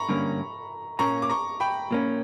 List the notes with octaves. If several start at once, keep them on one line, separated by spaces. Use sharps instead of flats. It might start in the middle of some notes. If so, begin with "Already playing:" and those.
Already playing: A#5 B5 C#6
G2 D3 A#3 C#4
A#2 A#3 C#4 A#5 C#6
D6
A#5 C#6
G5 B5
A#2 A#3 C#4